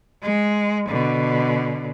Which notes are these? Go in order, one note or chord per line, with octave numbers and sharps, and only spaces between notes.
G#3
B2 D3